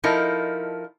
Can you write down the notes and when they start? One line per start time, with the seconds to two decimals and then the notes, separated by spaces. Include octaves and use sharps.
0.04 F3 D#4 E4 A4 A#4